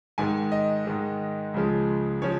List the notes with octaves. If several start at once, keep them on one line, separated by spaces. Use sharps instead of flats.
G#2 D#3 G#3 G#5
D#5
G#2 D#3 G#3
C#2 C#3 F3 G#3
C#3 F3 G#3 C#5